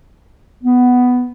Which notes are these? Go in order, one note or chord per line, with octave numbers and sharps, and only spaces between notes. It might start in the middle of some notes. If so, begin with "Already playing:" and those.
B3